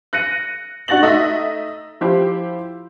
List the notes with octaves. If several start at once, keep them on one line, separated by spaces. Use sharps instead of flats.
F#6 A#6 C#7 D#7
D4 F#4 F#5 A6 A#6 F#7
A3 D#4 D#5 E5
F3 E4 G4 C5